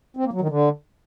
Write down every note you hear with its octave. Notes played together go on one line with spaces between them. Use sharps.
C4
A#3
F#3
D#3
D3